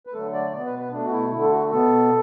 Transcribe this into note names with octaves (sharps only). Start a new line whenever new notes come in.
B4
D3 F#3 A3 A4
D5
B2 B3 D5
B4
B4
B2 A3 D4
F#4
E4
D3 A3 E4
A4
F#4
B2 B3 A4